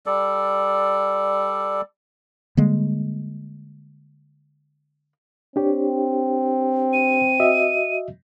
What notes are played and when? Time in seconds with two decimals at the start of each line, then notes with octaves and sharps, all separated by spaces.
0.06 G3 A4 D5
2.57 D3 G3 G#3 A#3
5.56 C4 D4 G4 C#5
6.93 D#7
7.40 F#4 D#5 E5